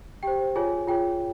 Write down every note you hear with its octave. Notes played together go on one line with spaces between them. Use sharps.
G4 C5 G5
F4 G#4 C#5 G#5
F4 G#4 C#5 G5